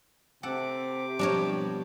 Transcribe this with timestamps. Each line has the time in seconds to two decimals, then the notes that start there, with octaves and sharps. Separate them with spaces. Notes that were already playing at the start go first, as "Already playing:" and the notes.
0.43 C3 G4 A4 F#5 D6
1.19 B2 F3 G3 D4 A#4 C#5